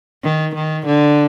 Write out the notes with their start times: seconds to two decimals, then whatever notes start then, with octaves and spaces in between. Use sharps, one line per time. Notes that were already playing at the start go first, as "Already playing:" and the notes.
0.24 D#3
0.55 D#3
0.86 D3